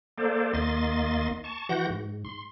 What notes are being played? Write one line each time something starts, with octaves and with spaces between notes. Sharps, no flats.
A#3 A4 C5 D5
D#2 A#3 D#5 C6 A6
A5 C#6
E3 F#4 F#5 G6 A#6
G#2
C6